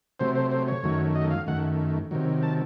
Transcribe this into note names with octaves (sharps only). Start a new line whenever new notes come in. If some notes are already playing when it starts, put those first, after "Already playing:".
C3 F#3 A3 C5
C5
C5
C#5
F#2 D#3 F#3 A3
D#5
F5
F#2 D#3 A3 F#5
C3 D#3 F#3
A5